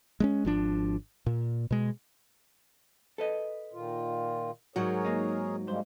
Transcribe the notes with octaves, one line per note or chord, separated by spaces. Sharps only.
G#3 A3 C#4
G#1 F3 D4
A#2
B2 G#3
A4 B4 D#5
A#2 D#3 F4
G#2 F#3 F#4 G#4 A#4 C#5
A#3 D#4
G2 G3 G#3 A#3 C5